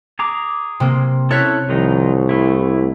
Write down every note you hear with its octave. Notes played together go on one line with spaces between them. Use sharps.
G#4 A#5 D6
C3 A#3
C#4 E4 A4 C#5 F#6 B6
C2 D#3 F3 D#4
A3 E4